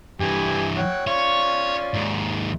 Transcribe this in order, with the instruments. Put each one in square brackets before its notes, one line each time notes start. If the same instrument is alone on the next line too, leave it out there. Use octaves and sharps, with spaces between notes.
[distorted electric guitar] G2 E3 [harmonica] G4 G#5
[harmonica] C#5 F#5 G5
[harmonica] C#4 F4 D5 [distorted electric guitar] C#5
[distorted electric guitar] D#2 G#2